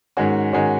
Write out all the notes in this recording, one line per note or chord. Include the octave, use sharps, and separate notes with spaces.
G#2 D#3 G#3 C#4 F#4
G#2 D#3 G#3 C#4 F#4